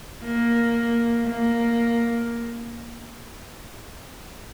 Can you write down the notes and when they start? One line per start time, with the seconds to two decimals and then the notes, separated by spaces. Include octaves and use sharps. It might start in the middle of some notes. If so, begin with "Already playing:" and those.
0.24 A#3
1.27 A#3